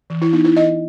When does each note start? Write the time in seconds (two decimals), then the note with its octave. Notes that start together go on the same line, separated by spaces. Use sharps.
0.10 E3
0.22 E4
0.33 B3 D#4
0.45 E4
0.56 E3 D#5